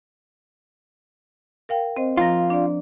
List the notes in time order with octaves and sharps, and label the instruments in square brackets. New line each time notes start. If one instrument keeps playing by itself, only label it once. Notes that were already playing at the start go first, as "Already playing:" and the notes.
[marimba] A#4 F5 G5
C4 C5 D#5
[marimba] F3 A#5 A#6 [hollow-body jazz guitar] F4
[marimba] D4 D5